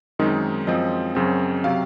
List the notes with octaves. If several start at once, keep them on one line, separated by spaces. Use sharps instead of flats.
F#2 D#3 G#3 C4 D#4
F#2 F3 G#3 C4 D#5
F#2 C#3 F#3 C4
C3 F#3 C4 F5